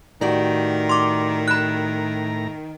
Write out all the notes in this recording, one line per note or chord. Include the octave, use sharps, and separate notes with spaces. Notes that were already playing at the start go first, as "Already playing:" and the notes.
A2 D#3 F#4 G4 D5 A#5
C6 D6
B5 F#6